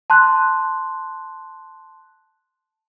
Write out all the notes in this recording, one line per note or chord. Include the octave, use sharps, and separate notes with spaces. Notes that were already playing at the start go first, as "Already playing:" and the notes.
A5 C6 F#6